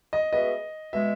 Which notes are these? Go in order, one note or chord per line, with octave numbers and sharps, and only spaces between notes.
D#5
G#3 B3 F#4 B4 D#5 E5
B2 G#3 E5